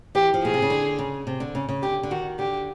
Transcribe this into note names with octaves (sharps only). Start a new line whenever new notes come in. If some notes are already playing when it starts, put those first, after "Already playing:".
E3 G4
F3
B2 G#4
C3
C#3
D3
C#3
C3
D3
C#3
C#3
D3 G4
D3
D#3 F#4
D3 G4